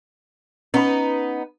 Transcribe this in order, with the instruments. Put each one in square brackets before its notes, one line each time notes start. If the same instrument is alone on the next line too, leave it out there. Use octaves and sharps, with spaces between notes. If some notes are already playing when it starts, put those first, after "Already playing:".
[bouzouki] B3 D#4 [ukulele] C#4 B5